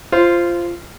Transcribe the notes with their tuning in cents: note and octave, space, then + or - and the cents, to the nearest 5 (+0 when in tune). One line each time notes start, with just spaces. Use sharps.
F4 -15 C5 +0